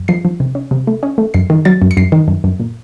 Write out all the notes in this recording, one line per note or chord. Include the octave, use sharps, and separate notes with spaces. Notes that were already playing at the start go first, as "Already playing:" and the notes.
Already playing: F#2
F3 C7
F3
C3
C#4
C3
A3
C#4
A3
F#2 C7
D#3
F#3 A6
F#2
C#7
F#2 C7
D#3
F#2
F#2
A#2